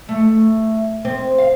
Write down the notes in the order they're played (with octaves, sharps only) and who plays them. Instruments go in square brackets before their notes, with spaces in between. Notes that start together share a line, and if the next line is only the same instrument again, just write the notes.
[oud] A3
C4
F5